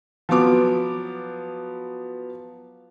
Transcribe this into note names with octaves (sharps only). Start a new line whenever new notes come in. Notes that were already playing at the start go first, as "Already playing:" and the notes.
F3 F#3 B3 D6